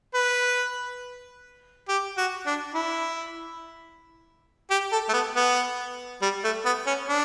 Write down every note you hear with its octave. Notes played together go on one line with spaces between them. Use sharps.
B4
G4
F#4
D4
E4
G4
A4
A3
B3
B3
G3
A3
B3
C#4
D4